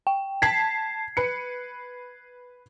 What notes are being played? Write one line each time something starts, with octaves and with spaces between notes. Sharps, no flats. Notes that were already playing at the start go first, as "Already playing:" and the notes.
G5
A5 G#6 B6 C7
B4 C#7